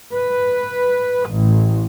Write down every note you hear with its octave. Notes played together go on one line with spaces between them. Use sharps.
B4
A1